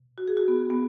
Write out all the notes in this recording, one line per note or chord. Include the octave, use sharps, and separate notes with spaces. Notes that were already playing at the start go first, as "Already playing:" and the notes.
Already playing: B2
F#4
G#4
F#4
B3
B3